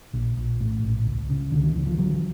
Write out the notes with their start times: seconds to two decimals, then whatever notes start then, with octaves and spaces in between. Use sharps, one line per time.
0.13 A#1
0.37 A#1
0.60 A2
0.83 A#1
1.06 C#2
1.30 C#3
1.52 C#2 D3
1.63 D#3
1.75 C#2 E3
1.87 F3
1.98 D3 E3 F#3